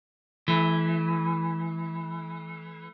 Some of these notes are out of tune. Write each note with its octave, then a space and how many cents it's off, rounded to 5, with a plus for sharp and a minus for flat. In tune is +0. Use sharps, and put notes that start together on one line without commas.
E3 +0 A3 -35